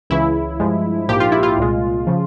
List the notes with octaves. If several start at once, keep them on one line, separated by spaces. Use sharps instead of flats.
C#2 C#3 E3 E4
G2 F3 G#3
A#1 G#2 F3 A#3 G4
F4
E4
F4
C2 A#2 G#3
C#3 F3